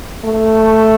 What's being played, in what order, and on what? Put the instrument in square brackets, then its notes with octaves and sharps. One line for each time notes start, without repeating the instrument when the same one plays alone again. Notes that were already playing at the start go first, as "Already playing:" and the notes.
[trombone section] A3